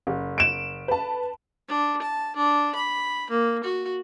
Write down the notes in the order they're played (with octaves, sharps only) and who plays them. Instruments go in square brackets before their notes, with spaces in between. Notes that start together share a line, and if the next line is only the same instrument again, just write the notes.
[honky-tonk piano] F#1
[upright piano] D7 E7
[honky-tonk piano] B4 A5
[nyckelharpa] D4
A5
D4
B5
A#3
F#4